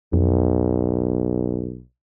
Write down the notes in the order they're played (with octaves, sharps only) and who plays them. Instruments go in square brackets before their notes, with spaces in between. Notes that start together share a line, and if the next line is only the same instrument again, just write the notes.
[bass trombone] B1 [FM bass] F2